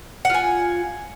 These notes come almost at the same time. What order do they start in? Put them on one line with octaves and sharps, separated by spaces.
F#5 F4 G#5